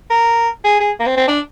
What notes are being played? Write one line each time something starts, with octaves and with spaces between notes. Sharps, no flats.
A#4
G#4
G#4
A#3
C4
C4
D4